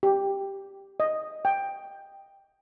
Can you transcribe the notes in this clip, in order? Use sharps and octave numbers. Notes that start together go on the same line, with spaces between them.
G4
D#5
G5